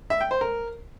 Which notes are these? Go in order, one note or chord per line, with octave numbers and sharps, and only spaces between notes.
E5
G5
C5
A#4